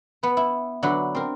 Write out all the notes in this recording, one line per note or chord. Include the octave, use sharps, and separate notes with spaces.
B3 B4
E4
D3 F#3 F#4 B4
C4 A#4